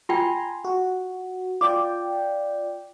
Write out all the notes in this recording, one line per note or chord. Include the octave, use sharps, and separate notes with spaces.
F4 G5 G#5 A#5 C6
F#4
F4 D5 G5 D6